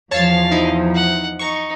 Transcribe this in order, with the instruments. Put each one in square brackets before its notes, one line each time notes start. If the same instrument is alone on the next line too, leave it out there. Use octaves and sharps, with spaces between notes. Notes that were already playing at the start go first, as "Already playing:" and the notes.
[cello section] E2 F3 [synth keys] C#5 A5 A6 [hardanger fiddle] F5
[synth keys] D#4 E4
[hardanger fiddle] F#5
[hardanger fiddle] D#4 [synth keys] C#6